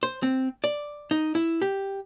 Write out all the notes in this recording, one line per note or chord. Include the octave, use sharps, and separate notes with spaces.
C5
C4
D5
D#4
E4
G4